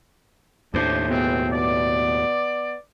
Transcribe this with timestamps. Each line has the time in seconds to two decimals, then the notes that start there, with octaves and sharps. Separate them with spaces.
0.74 D#2 A2 D4 C5
1.09 B2 G#3 B3 C4
1.51 B3 D5